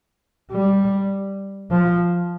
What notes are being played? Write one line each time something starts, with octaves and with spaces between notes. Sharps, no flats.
G3
F3